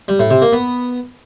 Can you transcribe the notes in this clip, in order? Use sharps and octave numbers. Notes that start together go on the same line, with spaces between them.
G3
A2
C3
A#3
B3